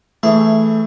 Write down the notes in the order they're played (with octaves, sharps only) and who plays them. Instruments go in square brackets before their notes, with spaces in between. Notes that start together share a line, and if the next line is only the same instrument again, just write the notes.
[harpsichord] E3 G#4 [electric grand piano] A3